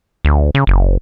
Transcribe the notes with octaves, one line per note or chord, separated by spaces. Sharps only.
D2
C#3
F#1